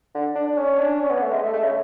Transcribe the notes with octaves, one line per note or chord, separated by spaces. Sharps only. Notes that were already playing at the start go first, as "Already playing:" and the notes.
D3
D4
D4
C#4
D4
C#4
B3
A3
G#3
A3
A3
C#3